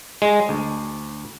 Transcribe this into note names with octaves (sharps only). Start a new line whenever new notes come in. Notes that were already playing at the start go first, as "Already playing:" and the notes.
G#3
D2